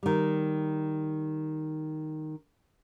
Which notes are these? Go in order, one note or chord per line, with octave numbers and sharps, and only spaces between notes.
D#3 G3